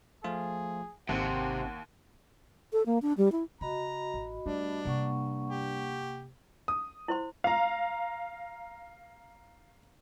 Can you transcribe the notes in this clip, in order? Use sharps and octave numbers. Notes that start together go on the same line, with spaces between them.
F3 A3 F4 G#4
G#1 D#2 C3 C4 F#5
A4
A#3
D4
G3
E4
C#3 F#4 D#5 A#5 B5
A1
G2 A3 D4
C3 A#3 F#5 C#6
G4
D#6
E4 C5 C6
F5 A#5